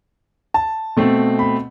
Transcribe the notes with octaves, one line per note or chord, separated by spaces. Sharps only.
A5
B2 A3 C4
B5